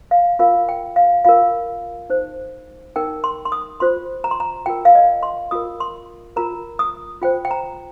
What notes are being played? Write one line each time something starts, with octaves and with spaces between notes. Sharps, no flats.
F5
F4 A#4 F5
G5
F5
F4 A#4 F5
D#4 C5
D#4 A#4 G5
C6
C6
D#6
F4 C5 C6
A#5
C6
A#5
F4 A#4 G5
F5
D#5
C6
F4 A#4 D#6
C6
F4 A#4 A#5
D#6
F4 C5 G5
G5
A#5